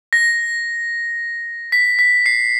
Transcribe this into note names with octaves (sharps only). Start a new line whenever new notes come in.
A#6
B6
B6
C7